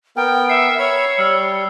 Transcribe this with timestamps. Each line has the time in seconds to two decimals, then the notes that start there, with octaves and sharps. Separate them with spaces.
0.17 B3 A#4 G5
0.49 E5 C7 C#7
0.78 C#5 B5 E6
1.18 G3 E6 F6 C7